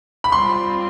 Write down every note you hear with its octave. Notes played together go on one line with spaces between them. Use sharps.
B5
G3 C4 F4 C6